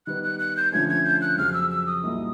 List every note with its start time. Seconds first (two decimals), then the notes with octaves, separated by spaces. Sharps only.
0.07 D#3 G3 B3 F#6
0.24 F#6
0.39 F#6
0.57 G6
0.72 D3 F3 A3 C#4 G#6
0.89 G#6
1.05 G6
1.21 F#6
1.38 F2 C#3 F#3 F6
1.54 E6
1.71 E6
1.87 D#6
2.03 C2 A#2 F#3 A#3 D#4